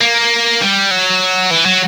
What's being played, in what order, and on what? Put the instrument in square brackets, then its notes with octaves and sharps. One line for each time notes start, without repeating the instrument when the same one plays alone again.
[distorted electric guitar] A#3
G3
F#3
E3
F#3